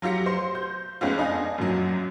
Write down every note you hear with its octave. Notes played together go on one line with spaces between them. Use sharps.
F#3 F4 G4 A#6 C#7
C5 C6
G6
F2 G#3 B3 C#4 F4
D4 D#5 F5 G#5
F#2 A#2 F#3